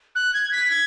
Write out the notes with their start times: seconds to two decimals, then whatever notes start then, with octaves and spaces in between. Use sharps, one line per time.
0.15 F#6
0.34 G#6
0.52 B6
0.70 G#6